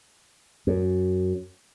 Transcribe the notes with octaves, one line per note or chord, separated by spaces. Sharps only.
F#2